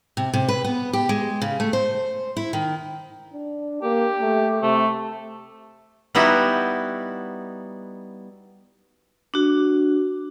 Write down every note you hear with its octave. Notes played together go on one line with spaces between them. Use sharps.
C3
C3
B4
B3
G4
G#3
C#3
A3
C5
E4
D#3
D4
A#3 G4
A3
C3 A3
G3 B3 D#4 E4 F#4
D4 F#4